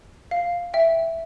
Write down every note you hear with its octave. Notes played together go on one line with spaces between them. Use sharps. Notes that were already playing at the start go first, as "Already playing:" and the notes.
F5
E5 G5